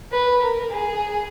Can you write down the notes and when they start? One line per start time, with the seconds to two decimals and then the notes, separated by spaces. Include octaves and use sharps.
0.12 B4
0.42 A#4
0.72 G#4